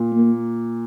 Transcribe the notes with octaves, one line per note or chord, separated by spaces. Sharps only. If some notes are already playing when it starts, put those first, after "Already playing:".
Already playing: A#2
A#3